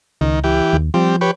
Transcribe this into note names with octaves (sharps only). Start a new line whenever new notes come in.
C#2 D#3
E3 G4
D#2
F3 G3 C4
G4 B4 C#5